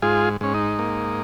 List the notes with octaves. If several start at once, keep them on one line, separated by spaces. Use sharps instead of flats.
G#2 F4 G#4
G#2 C#4
D#4
A#3